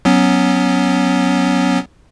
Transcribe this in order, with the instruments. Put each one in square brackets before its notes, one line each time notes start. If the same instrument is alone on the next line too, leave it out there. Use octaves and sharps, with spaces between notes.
[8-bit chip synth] F#3 B3 C#4